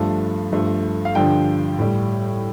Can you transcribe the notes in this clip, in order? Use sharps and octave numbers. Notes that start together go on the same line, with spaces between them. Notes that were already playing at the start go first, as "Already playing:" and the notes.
Already playing: G2 F3 A3 A5
G2 F3 A3
F5
G2 D3 F3 G5
A2 G3